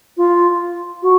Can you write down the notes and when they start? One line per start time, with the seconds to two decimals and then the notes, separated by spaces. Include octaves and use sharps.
0.17 F4
1.03 F#4